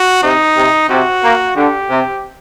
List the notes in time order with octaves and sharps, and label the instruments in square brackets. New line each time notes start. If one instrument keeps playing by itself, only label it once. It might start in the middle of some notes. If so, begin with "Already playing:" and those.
Already playing: [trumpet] F#4
[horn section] C3 [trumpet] D#4
[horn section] C3
[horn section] C3 [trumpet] F#4
[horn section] A#3
[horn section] D3 [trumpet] G4
[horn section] C3